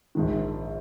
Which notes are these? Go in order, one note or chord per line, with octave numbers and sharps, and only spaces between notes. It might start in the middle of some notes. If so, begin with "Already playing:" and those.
A#1 G#2 D#3